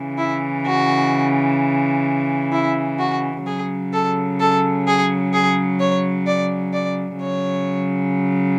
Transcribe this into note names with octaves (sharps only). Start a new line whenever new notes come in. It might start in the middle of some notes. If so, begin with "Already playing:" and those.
Already playing: C#3 E3
E4
F#4
E4
F#4
C#3 F#3 G#4
A4
A4
G#4
G#4
C#5
D5
D5
C#3 F#3 C#5